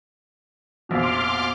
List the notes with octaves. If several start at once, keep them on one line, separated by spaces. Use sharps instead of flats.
F1 A#1 B2 C6 D6 F6